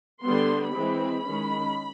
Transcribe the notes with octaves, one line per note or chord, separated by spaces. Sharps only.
D3 G3 B3 C6
E3 G#3 C4 B5
D#3 G#3 C#4